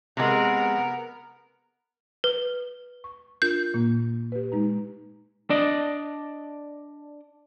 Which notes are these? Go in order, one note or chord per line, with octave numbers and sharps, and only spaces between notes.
C3 G#3 B3 A#4
B4
C#6
D4 F4 A#4 G6
A#2 A#3
G4 B4
G#3 D#4 A#5
D4 D5 D#5